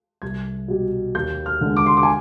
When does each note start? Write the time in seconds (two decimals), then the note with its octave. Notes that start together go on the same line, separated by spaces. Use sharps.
0.22 C2 G#6
0.68 B2 G3
1.15 D#2 G6
1.46 F6
1.61 D3 G#3
1.77 D6
1.86 C6
1.97 D6
2.03 G#5